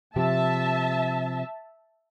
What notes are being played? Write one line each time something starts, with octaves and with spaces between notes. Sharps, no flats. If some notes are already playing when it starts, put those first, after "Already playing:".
C3 F3 G4 E5 A5